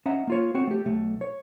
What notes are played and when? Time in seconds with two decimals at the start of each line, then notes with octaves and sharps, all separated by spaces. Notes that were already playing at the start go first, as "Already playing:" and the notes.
0.06 C#4 D#5 E5 F#5 A#5
0.27 A#3 F4 C#5
0.55 C4 F#4 C#5
0.67 A3 G4
0.85 B1 A3
1.21 C#5